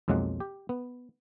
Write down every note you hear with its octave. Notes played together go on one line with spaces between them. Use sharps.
B1 F2 F#3 G#3 A#3 F#5
G4
B3